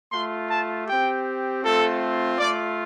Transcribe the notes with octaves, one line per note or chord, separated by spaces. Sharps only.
A3 F4 C6
A5
C4 G4 G5
A3 C4 F4 A4
A3 F4 D5